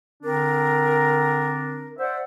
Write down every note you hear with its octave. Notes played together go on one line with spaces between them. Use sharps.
D3 C4 D4 A#4
C5 D5 E5 F#5